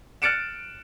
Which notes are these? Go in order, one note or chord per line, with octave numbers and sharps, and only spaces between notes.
F6 F#6 A6 C#7 D7 E7